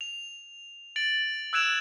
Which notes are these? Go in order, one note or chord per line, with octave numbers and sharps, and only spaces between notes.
F7
A6 D7 F#7
E6 F#6 G#6 D7 E7 F7